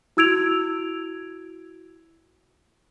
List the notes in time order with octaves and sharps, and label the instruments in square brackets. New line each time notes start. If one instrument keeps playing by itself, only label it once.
[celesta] E4 F#4 E6 G#6 D7 F7